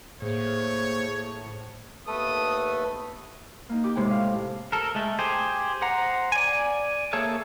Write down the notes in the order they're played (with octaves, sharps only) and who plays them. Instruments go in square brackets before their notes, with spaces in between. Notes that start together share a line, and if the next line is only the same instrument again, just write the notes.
[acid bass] A2 [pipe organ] A#3 G#4 C5 [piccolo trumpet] C#5
[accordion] D#2 B3 B4 [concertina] A3 A4 [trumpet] D#6
[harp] A#3 D#4
G4 D6
A2 C3 G#3 G5
F5
[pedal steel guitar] A4 A#4
G#3 A3
G4 G#4 C5
C5 F#5 A#5
D5 G#5
A#3 G#4 A4 C#5 E5